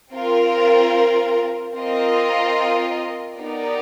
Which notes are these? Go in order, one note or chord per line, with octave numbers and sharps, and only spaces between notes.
C4 F4 A#4
C4 F4 A#4 D#5
B3 D#4 G4 A#4 D5